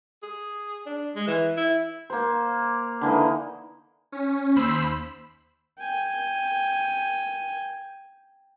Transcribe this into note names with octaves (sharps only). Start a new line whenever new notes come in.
G#4
D4
G#3
E3
E4
A#3 C5
D3 E3 A#3 D#4
C#4
D#2 C5 B5 E6
G5 G#5